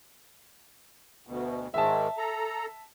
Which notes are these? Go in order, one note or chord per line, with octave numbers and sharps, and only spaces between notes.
D2 B2
G#2 D#3 G#3 E5 A5
A4 A#5